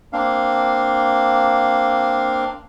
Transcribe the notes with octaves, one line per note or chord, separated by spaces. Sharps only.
A#3 C4 D4 F5